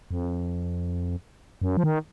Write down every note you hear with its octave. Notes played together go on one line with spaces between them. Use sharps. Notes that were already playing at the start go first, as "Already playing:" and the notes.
F2
F#2
F3
D#3